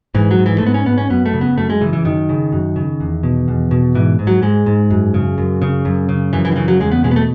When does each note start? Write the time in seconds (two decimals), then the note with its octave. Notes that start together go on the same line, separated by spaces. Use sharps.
0.15 G#2 E3
0.31 F#3
0.39 G#2
0.46 E3
0.58 A3
0.62 G#2 B3
0.74 C#4
0.86 G#2 B3
0.98 C#4
1.09 F#2 B3
1.26 A3
1.34 C#3
1.41 B3
1.57 F#2 A3
1.70 G#3
1.81 C#3 E3
1.93 E3
2.05 F#2 D#3
2.29 C#3
2.52 F#2
2.76 C#3
3.00 E2
3.23 B2
3.48 E2
3.71 B2
3.95 G#2 E3
4.19 G#2
4.27 F#3
4.42 G#2 G#3
4.66 G#2
4.90 F#2
5.14 C#3
5.38 F#2
5.62 C#3
5.85 F#2
6.09 C#3
6.33 F#2 E3
6.45 E3
6.52 D#3
6.56 C#3 E3
6.68 F#3
6.80 E2 G#3
6.92 B3
7.04 B2 G#3
7.11 B3
7.16 A3